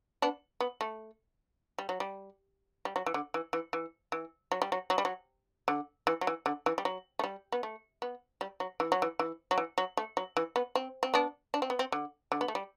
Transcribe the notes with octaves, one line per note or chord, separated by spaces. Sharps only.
B3 D4
B3
A3
G3
F#3
G3
G3
F#3
E3
D3
E3
E3
E3
E3
F#3
G3
F#3
F#3
G3
F#3
D3
E3
F#3
E3
D3
E3
G3
F#3
A3
G3
B3
A3
B3
G3
F#3
E3
F#3
E3
E3
F#3
E3
F#3
A3
F#3
E3
B3
C4
C4
B3 D4
D4
C4
B3
C4
D3
D3
B3
A3
G3